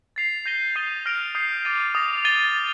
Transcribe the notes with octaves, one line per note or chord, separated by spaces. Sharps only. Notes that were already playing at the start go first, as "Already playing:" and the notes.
A6 C7 F7
G6 A#6 D#7 G7
D#6 A6 C7 D#7 G7
F6 A#6 D7 F7
D#6 G6 C7
D6 A6 D#7
D#6 A#6 F7
A6 D#7 G7